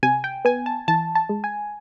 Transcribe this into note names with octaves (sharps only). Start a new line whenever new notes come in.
C3 G#5
G5
B3 G#5
A5
E3 A5
A5
G#3
G#5